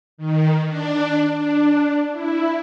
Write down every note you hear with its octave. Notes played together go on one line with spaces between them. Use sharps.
D#3
D4
D4
E4